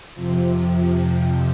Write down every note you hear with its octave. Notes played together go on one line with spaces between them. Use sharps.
F2 C3 F3